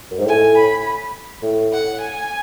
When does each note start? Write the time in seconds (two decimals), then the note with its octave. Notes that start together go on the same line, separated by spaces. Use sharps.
0.11 F#2
0.19 G#2
0.26 A2 G#5
0.56 B5
1.42 A2
1.72 F#5
2.01 G#5